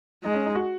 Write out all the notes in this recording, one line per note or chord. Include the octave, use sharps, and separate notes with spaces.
G#3 D#4
C#4
D#4
F#4